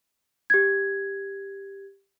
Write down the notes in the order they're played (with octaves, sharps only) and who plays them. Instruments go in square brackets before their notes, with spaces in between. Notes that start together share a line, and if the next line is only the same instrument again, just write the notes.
[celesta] G4 G#6